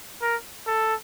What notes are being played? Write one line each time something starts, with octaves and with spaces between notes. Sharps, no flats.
A#4
A4